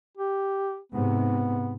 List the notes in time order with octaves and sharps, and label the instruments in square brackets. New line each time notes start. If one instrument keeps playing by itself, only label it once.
[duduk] G4
[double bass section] G#2 C3 [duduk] B3